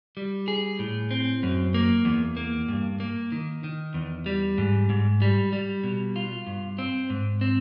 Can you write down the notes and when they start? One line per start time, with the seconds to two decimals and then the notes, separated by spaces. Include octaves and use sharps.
0.17 G3
0.48 G#4
0.79 A2
1.11 C4
1.43 F#2
1.74 A#3
2.05 E2
2.37 A#3
2.69 G2
3.00 A#3
3.32 D#3
3.64 D#3
3.94 E2
4.26 G3
4.58 G#2
4.90 G#2
5.22 G3
5.53 G3
5.84 B2
6.16 F4
6.47 G2
6.78 C4
7.10 G#2
7.41 C4